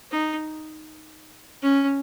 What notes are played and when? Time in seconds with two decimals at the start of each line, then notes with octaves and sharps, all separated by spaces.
0.11 D#4
1.63 C#4